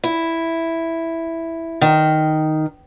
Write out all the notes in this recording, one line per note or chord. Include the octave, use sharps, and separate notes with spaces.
E4
D#3